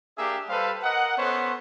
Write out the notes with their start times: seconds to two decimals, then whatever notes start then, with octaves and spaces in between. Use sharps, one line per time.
0.18 A#3 D4 G4 G#4 E5
0.49 G3 A4 B4 C5 F5
0.83 A#4 D#5 F#5
1.18 B3 C#4 A4 C5 C#5